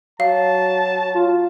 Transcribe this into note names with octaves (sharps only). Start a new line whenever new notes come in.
F#3 F5 A5
F4